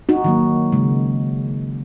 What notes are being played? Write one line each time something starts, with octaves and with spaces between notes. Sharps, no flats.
D#4 F#4
D#3 F#3 A#3
C#3 G#3